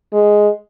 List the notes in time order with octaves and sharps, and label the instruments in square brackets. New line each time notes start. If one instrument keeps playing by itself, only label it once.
[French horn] G#3